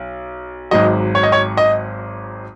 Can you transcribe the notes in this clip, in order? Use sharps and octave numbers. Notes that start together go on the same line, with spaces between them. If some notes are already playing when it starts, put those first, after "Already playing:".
Already playing: B1
G#1 G#2 F#3 D#5
C#5
D#5
C#5
D#5